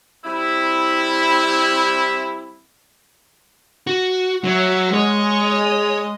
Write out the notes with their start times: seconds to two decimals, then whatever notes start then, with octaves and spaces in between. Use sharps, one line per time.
0.25 G3 C4 E4
3.87 F#4
4.44 F#3 C#5 E5 F#5
4.94 G#3 C#5 D#5